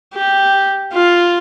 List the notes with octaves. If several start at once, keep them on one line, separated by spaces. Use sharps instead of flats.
G4
F4